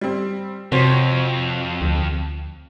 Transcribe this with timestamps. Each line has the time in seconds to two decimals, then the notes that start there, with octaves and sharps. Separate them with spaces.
0.01 G3 C4
0.72 F2 C3 F#4 C5 C#5
1.82 D2